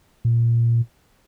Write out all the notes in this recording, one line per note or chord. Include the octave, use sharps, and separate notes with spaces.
A#2